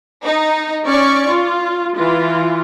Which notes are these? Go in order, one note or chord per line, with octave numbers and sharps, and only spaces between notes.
D#4
C#4 D5 C#6
F4
E3 F4